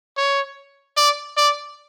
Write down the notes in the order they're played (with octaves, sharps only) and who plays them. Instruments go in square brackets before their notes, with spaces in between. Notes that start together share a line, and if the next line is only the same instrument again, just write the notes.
[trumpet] C#5
D5
D5